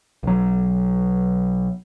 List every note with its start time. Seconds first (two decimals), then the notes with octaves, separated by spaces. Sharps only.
0.23 B1 F#3